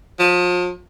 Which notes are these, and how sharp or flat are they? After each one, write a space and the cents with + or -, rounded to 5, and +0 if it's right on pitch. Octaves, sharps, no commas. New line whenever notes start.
F3 +35